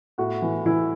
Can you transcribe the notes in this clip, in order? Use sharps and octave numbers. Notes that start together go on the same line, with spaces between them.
A2 F#4
E3
E3 E4